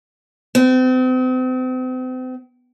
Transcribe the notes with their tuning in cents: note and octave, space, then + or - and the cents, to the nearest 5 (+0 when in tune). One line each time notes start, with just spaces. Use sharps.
C4 -40